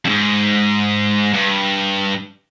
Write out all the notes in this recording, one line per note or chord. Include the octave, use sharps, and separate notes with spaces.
F2 G#2
G2